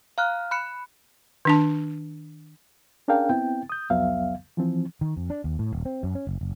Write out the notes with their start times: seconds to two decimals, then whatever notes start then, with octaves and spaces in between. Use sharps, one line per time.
0.18 F5 A#5 F6 F#6
0.51 B5 F#6 C#7
1.45 D#3 D4 A5
3.08 C#4 D4 G#4 A#4 F5 G5
3.29 B3 C4 E4 G5
3.70 D#6 G6
3.90 C2 F2 F#3 B3 E5 F5
4.57 E3 F3 C4
5.01 D#3
5.17 F2
5.30 D4
5.44 D#2
5.59 A2
5.72 D#1
5.85 C4
6.03 F#2
6.15 C#4
6.27 F#1
6.41 F#1